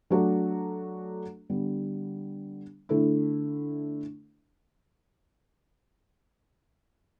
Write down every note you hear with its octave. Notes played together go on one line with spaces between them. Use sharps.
F#3 A3 D4 F#4 A4
D3 G3 B3
D3 A3 E4